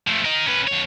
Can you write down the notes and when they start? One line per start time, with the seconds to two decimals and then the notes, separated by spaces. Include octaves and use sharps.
0.07 F3 A3
0.25 A#4 D#5
0.47 C#4 B4
0.68 F2 C#5